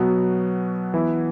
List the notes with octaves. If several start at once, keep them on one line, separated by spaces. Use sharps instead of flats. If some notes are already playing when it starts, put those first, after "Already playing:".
Already playing: B2 F#3 B3 F#4
E3 B3 E4